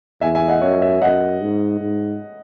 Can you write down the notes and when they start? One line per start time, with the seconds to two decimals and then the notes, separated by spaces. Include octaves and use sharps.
0.21 E2 E5 G#5
0.35 E5 G#5
0.48 D#5 F#5
0.61 F#2 C#5 E5
0.81 C#5 E5
1.02 F#2 D#5 F#5
1.41 G#2
1.80 G#2